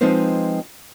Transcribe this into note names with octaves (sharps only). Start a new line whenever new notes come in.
F3 G#3 C4 D#4 B4 C5